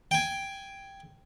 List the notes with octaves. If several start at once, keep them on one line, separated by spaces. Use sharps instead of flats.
G5 G#5